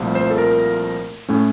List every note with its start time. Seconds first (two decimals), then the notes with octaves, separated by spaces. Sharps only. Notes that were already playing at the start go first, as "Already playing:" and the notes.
Already playing: C2 A#2 F3 A3
0.15 C5
0.30 A4
0.38 A#4
1.29 A2 A3 C#4